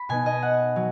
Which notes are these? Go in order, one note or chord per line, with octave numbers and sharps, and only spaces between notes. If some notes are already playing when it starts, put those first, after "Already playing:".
Already playing: B5
B2 B3 D#4 G#5
D#5
F#5
F#3